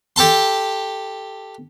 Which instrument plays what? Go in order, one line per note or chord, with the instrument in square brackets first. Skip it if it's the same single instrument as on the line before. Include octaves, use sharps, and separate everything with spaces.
[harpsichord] G4 A4 A5 C6